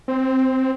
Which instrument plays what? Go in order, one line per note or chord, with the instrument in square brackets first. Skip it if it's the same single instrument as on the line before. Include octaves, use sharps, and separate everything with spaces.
[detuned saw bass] C4